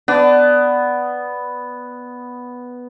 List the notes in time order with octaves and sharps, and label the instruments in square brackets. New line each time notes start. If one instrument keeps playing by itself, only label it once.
[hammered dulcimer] B3 [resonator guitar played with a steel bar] D4